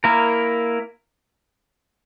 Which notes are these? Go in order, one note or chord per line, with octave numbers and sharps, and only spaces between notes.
A#3 E4 A#4